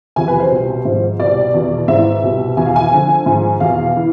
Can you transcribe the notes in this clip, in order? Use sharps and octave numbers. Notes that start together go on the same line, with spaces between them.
E2 C3 F3 G#5
B4
C5
C2 B2
G#2 F3
C2 B2 D5
E2 B2
G#2 E3 E5
C2 B2
E2 B2 G#5
F5
G#5
F2 D3 F3
G#2 F3
E2 B2 F5
E3